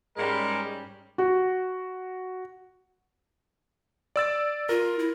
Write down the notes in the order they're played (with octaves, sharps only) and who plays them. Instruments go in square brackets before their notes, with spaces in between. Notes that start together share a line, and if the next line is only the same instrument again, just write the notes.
[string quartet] G#2 G3 C#4 [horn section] G#3 [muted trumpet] A#4
[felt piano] F#4
[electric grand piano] D5 E6 A6
[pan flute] F4 [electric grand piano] A#4
[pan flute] E4